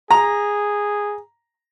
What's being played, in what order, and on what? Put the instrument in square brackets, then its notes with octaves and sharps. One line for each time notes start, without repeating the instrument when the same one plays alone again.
[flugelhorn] G#4 [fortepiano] A#5